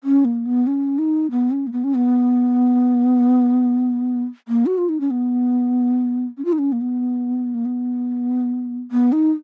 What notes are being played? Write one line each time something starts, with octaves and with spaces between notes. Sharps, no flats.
C#4
A#3
B3
C#4
D#4
B3
C#4
A#3
B3
C#4
B3
A#3
F#4
F4
D#4
C#4
B3
C#4
F4
D#4
C#4
A#3
B3
A#3
B3
B3
D#4